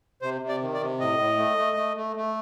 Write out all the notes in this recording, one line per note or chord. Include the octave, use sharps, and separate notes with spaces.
C3 C5
C3
D5
D#3
D5
C3
A2 D#5
A2
A3
A3
A3
A3
A3